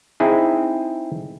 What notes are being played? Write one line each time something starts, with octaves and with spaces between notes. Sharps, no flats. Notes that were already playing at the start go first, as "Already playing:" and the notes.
C4 D#4 E4 G#4